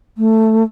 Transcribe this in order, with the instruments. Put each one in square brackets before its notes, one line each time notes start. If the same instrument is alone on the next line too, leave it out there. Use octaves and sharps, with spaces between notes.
[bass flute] A3